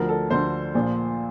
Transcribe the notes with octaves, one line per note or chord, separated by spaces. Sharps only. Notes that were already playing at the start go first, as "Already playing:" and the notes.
Already playing: D2 D3 F3 A#4
A4
D2 D3 F3 C5
A#1 A#2 F3